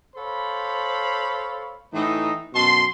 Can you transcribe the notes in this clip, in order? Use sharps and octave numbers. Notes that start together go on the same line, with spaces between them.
A4 C5 C#5 F5 B5
A2 E3 D#4
F#2 B2 A5 C6